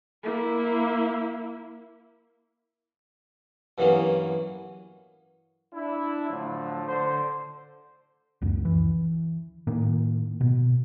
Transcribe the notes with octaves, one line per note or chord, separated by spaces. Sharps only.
A#3 E4
G2 E3 F#3 A#3 B3 C#4
D4 E4
A2 D3 F3 F#3 A3
D3 C5
C#2 F#2
E3
A2 D#3 A#3
B2